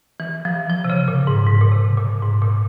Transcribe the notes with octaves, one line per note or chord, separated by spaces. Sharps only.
E3
F3
F3
C3
C#3
A#2
G#2
G#2
A#2
C3
A#2
G#2
A#2